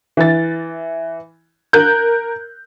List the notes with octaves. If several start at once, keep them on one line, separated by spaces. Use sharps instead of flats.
E3 A6
A#4 F#6 G6